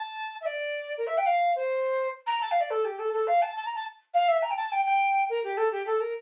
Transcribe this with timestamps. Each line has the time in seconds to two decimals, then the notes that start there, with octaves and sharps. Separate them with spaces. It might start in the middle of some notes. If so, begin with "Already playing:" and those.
Already playing: A5
0.41 E5
0.45 D5
0.98 A#4
1.07 E5
1.17 G5
1.26 F5
1.56 C5
2.26 A#5
2.41 A5
2.51 F5
2.60 D5
2.70 A4
2.85 G4
2.99 A4
3.13 A4
3.27 F5
3.42 A5
3.56 A5
3.65 A#5
3.75 A5
4.13 F5
4.28 E5
4.42 A#5
4.50 G5
4.56 A5
4.72 G5
4.85 G5
5.29 A#4
5.44 G4
5.57 A4
5.72 G4
5.86 A4
6.00 A#4